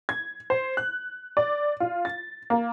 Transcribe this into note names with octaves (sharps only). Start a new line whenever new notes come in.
G#6
C5
F#6
D5
F4
A6
A#3